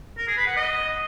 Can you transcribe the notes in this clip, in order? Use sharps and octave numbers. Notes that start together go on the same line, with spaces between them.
A#4
G#4
B4
F#5
D#5